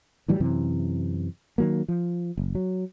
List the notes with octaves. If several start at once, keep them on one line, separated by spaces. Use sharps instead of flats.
A2 E3 F#3 G3
F#2 C3 E3
D#3 F#3 A#3
F3
F#1
F#3